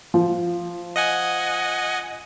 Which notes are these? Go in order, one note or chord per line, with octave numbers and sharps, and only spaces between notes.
F3
D#5 F#5 G#5